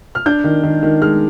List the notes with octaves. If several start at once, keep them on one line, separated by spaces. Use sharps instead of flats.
F6
D4 G6
D#3
D#3
D#3
G#3 F6